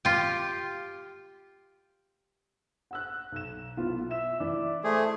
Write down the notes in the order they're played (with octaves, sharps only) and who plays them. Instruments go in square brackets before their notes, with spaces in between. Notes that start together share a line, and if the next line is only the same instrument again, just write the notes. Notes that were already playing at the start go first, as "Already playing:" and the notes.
[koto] F4 G4
[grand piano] F#5 E6 F#6
B1 E7
B1 B3 F4
[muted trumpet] E5 [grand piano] E7
[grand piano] E3 [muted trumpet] D5
[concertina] A3 G#4 [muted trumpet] C5